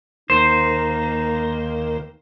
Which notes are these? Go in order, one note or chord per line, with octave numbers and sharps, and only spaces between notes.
D#2 A#3 D#4 C5